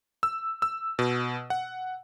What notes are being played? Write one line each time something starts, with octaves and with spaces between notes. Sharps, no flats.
E6
E6
B2
F#5